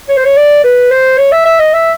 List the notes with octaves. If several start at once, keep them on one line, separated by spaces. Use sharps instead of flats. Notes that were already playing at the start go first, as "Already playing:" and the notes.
C#5
C5
C#5
D5
B4
C5
C#5
E5
E5
D#5
E5